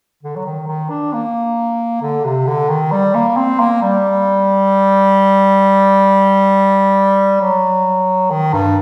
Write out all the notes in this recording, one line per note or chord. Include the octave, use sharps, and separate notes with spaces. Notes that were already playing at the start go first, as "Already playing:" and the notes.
D3
F#3
D#3
D#3
D4
A#3
D3
C3
D3
D#3
G3
A#3
C4
A#3
G3
F#3
D#3
G2